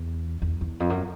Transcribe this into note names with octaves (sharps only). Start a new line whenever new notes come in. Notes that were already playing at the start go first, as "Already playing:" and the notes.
Already playing: E2
E2
E2
F2
F#2